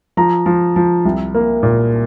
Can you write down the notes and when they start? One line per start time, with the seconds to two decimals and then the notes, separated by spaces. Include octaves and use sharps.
0.17 F3 A#5
0.46 F3
0.76 F3
1.05 C2
1.34 A#3
1.63 A#2